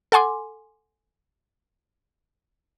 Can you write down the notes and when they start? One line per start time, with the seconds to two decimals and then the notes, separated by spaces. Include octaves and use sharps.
0.12 A4 F#5 G#5 C6 D6